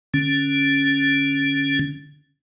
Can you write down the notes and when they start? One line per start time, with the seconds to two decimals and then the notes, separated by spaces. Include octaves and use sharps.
0.14 D3 C#4